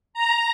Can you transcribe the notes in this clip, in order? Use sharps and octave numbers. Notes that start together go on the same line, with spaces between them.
A#5